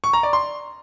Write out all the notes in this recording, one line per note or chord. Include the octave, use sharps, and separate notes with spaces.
C#6
A#5
D5
C6